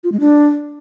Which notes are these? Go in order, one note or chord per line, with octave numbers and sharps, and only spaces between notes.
F4
G#3
D4